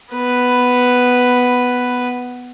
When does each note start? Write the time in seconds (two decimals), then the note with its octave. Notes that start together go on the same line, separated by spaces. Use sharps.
0.14 B3 B4